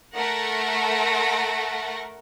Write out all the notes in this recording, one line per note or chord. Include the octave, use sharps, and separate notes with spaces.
A3 A#4 F#5 A#6